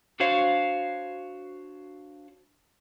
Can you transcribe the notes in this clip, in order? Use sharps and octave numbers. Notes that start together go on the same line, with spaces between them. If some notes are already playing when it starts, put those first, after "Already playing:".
D4 F#4 C5 C#5 F5